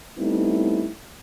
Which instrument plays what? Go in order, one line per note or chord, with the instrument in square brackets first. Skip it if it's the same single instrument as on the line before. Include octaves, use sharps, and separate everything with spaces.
[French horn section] G3 A3 B3 C4 D#4 E4